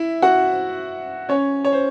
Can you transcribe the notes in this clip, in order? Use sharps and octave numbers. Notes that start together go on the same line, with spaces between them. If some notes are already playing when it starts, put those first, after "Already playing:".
Already playing: E4 E5
F#4 F#5
C#4 C#5
C#5
C5